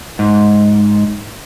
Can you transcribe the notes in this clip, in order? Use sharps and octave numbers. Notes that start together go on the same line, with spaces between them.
G#2